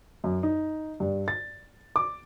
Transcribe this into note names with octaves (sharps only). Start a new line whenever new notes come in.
F#2
D#4
G2
A6
D6